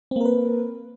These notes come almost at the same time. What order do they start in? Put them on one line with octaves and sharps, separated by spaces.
C4 A#3 A#4 B4